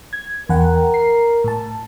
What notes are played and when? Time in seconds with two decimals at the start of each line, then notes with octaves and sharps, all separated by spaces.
0.13 G#6
0.49 E2 A#4 F#5 G5
0.94 C7
1.44 A2 A5